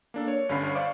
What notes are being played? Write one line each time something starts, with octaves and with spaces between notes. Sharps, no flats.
A#3 D4 A4
C#5
G1 G2 D3 C#4 B5 C7
C5 D5 F5 C#6 D6